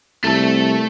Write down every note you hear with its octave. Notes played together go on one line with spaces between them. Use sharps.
C2 A3 A4